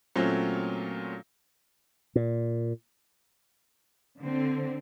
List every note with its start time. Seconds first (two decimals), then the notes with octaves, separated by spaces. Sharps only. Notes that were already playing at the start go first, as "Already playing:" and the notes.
0.16 A#2 F#3 A3 C4 C#4
2.16 A#2
4.20 D3 C4